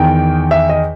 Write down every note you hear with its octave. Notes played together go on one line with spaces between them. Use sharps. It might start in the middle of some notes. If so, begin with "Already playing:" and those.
Already playing: E2 D#3 G5
E5
D#5